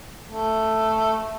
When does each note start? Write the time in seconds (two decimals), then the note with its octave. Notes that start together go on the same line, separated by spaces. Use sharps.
0.25 A3